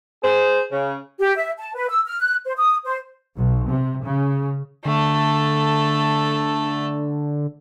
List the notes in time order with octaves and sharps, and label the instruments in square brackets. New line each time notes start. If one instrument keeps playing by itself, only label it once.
[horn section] G#4 C5
C#3
[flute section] G4
E5
A5
B4
E6
F6
F#6
C5
D#6
C5
[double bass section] B1
C3
C#3
[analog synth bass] D3 [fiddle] A3 A4